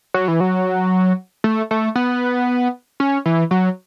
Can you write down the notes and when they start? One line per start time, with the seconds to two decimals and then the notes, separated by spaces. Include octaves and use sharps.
0.14 F#3
0.28 E3
0.40 F#3
1.44 A3
1.71 A3
1.95 B3
3.00 C#4
3.26 E3
3.51 F#3